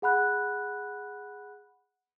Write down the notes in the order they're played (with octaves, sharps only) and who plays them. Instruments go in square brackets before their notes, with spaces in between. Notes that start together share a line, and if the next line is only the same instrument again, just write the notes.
[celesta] G#4 F#5 B5 F#6